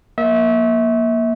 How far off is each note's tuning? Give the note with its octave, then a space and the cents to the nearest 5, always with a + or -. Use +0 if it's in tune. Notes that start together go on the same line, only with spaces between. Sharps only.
A#3 +15 E5 -30